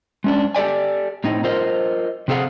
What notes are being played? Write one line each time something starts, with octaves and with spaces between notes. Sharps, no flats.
G#3 C#4 D4
G4 A4 D5 G#5
A2 C4 D#4
F4 A#4 C5 D#5
C3 C4 G#4 A4 F5 F#5